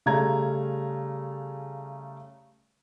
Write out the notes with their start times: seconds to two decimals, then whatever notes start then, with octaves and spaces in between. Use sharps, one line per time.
0.06 C#3 G3 A3 F5 A#5 G#6